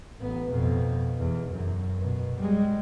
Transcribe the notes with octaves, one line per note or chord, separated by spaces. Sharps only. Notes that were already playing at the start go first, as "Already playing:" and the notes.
A1 B3
F2 B2
E2
F#2
B2
G3 G#3